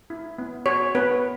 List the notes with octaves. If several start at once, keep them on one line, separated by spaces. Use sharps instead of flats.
E4
B3
F#4 C#5
B3 B4